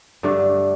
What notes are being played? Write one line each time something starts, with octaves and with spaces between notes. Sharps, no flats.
G2 D3 A3 D4